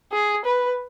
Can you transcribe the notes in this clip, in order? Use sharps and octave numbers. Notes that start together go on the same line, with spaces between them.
G#4
B4